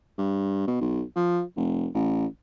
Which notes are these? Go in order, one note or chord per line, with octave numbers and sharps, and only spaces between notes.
G2
B2
B1
F3
F1
A1